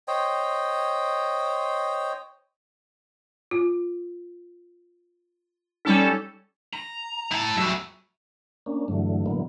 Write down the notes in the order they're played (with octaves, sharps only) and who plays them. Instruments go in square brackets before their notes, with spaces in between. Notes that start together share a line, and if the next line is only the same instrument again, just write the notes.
[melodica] C5 C#5 D#5 G5
[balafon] F4
[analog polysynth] G3 C#4 A4 [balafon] D#4
[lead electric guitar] A#5
[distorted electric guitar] E4 A5
[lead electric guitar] F#3 G3 [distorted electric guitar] F#4 E5
[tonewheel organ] A#3 C#4 D4
G2 D3 E3 F#3 A3
A2 D3 E3 F#3 A#3 B3